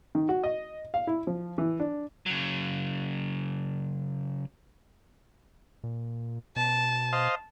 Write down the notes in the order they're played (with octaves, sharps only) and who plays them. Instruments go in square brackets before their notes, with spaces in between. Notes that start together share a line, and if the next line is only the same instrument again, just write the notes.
[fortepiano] D#3
F#4
D#5
F5
E4
F3
E3
D4
[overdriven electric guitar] C#3 F#3
[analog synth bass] A#2
[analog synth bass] B2 [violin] A5
[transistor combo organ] C5 D#5 F5